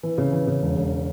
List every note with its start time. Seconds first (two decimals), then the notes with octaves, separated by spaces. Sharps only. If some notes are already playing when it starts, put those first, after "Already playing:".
0.03 E3
0.18 C#3
0.32 E3
0.47 C#3
0.62 E1
0.76 E1